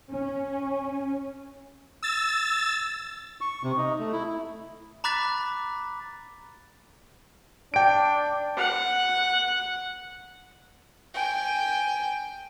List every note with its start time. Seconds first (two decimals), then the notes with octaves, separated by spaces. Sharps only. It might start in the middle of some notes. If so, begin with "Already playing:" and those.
0.11 C#4
2.03 E6 A6
3.41 C#6
3.64 C3
3.77 D#4
3.99 A3
4.13 E4
5.04 A#5 B5 D6 F#6 A6 B6
7.74 D4 G5 D7
8.57 F#5
11.14 G5 G#5